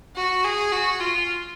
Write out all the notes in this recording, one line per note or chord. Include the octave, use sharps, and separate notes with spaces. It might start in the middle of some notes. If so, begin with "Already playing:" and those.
F#4
G#4
F#4
F4